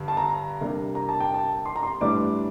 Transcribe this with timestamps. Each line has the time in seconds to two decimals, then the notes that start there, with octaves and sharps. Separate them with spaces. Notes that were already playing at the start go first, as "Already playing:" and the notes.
Already playing: G2 D3 G3
0.08 A5
0.17 A#5
0.61 C3 G3 A#3 D4
0.95 A#5
1.09 A5
1.20 G5
1.34 A5
1.66 C6
1.76 A#5
1.83 C6
2.01 A2 E3 G3 D4 D6